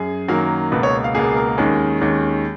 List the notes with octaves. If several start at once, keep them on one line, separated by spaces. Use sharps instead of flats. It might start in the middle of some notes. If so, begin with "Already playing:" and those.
Already playing: F#2 G#4
F#2 D#3 F#3 A#3 A#4
C#2 B2 A#3 B4
C#5
F5
C#2 B2 A#3 G#4
A#4
D#2 D#3 G#3 C#4
D#2 D#3 G#3 C#4